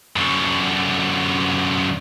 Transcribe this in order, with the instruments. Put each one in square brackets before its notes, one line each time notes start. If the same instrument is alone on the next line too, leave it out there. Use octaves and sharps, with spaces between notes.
[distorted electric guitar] F#2 D3